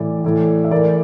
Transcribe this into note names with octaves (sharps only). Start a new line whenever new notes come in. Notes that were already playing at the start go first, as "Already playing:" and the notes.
Already playing: A2 E3 D5
A2 E3
E5
A2 E3 A#4 D5